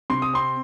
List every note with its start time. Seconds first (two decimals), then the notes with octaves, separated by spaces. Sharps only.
0.10 C3 C6
0.22 D#6
0.33 C4 C6